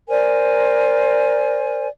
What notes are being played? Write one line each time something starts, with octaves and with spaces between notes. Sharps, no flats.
A#4 C5 D5 G#5